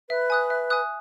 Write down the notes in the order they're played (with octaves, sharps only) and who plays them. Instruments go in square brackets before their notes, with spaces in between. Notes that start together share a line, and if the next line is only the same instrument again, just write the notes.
[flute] B4 [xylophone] E5
[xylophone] G#5 D#6 F#6
E5
G#5 D#6 F#6